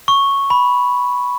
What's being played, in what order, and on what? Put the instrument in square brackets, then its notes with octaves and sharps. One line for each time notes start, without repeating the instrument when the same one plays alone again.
[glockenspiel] C#6
B5